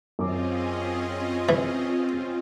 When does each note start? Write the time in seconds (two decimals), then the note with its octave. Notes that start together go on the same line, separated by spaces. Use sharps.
0.19 F#2 C4 C#4 F4 G#4 D#5 D6
1.49 E3